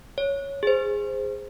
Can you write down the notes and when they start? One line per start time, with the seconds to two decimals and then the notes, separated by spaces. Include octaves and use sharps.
0.18 C#5
0.63 G#4 C5